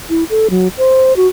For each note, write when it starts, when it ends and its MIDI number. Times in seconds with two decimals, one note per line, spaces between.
0.10 0.24 64
0.30 0.48 69
0.50 0.68 54
0.78 1.16 72
1.16 1.27 66